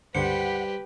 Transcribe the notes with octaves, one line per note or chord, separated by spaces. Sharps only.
C#2 G2 D3 G3 G4 B4 C5 F#5